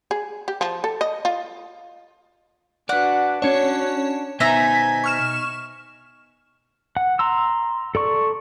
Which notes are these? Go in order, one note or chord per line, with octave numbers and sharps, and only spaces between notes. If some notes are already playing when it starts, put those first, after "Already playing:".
G#4
G4
F3
A4
D#5
F4
D4 F#4 B4 D5 F#5
C#4 D4 F#4 C#5
B2 B3 D#4 C5 E5 G#5 A#5 B6
C#6 F6 E7
F#5
A#5 C6 E6
A4 D5 C#6